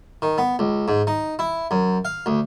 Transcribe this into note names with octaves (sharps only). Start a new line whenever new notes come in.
D#3
B3
C#2
G#2
D#4
E4
F#2
F5
D2